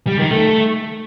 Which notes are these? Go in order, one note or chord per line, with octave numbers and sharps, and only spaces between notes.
G3
D#3
A3